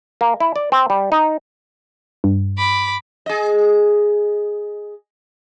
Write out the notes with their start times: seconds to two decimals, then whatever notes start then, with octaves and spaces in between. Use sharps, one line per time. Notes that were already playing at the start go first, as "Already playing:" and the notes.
0.21 A#3
0.40 E4
0.56 D5
0.72 C4
0.90 G3
1.12 D#4
2.24 G2
2.58 B5 D6
3.26 G#4 D#5